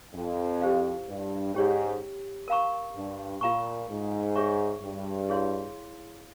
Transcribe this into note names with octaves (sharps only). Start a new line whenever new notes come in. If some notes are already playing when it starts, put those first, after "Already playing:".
F2
E4 G4 C5 F5
G2
G#2 C#4 G4 C#5
A#4 F5 A#5 C#6
G2
A#2 F4 A#4 F5 A#5 C#6
G#2
G#4 C#5 E5 A#5 C#6
G2
E4 G#4 C#5 F5 C6